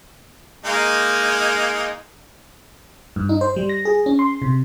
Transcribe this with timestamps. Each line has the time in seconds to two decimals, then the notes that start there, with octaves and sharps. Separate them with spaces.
0.65 G#3 A#3 D#4
3.16 G2
3.29 D#4
3.41 C5
3.56 G3
3.69 A#6
3.85 G#4
4.06 C#4
4.19 C6
4.42 C3